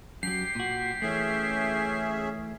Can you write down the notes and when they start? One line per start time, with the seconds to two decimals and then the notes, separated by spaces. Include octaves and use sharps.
0.23 F#2 F#3 G4 C7
0.55 A#2 F#4
1.02 E3 A3 C#4 G#4 E5